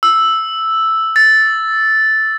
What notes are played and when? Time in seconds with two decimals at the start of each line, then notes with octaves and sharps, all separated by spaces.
0.03 E6
1.16 A6